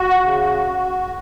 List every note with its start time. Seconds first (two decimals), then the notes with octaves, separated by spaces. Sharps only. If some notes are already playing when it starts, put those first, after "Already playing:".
Already playing: F#4
0.23 C#3